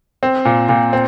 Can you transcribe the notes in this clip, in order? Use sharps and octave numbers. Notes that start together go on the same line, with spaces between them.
C4
A#2
A#2
C4